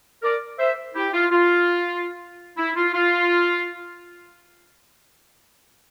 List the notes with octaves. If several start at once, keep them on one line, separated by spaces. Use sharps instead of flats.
A#4 D5
C5 E5
E4 G4
F4
F4
E4
F4
F4